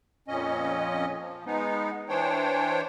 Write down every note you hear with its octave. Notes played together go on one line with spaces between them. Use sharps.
F2 A#2 C#4 D#5
F3
G#3 B3 D#4
E3 D4 C5 C#5 G5